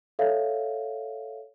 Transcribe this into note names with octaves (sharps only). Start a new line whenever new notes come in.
A4 C#5 E5 F5